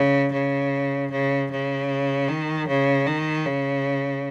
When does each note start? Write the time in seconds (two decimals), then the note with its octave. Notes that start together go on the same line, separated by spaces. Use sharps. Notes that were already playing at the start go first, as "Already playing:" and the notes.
Already playing: C#3
0.32 C#3
1.11 C#3
1.51 C#3
2.28 D#3
2.67 C#3
3.07 D#3
3.46 C#3